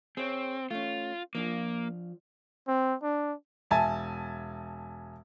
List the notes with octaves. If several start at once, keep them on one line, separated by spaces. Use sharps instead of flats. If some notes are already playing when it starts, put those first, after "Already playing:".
C4 G#4 C#5
A3 C#4 F4
F3 A#3 D4 F4
C4
D4
E1 E5 G#5 A5